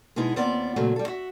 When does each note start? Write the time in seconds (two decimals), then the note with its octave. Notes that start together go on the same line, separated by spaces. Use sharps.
0.16 B2 G#3 B3 D#4 E4
0.36 D#2 B3 C4 F4 D5
0.76 A#2 C#3 F#3 A3 A#3 C4
0.96 G3 A4
1.08 F#4 E5